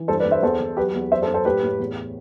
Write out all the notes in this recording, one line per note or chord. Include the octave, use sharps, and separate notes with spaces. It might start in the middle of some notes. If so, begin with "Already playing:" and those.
Already playing: E3
G2 A4 C5
B4 D5
G2
C5 E5
E2 A4 C5
E2
F#3 G4 B4
E2
F#2 C5 E5
A4 C5
F#2
A4 C5
A2 G4 B4
A2
E2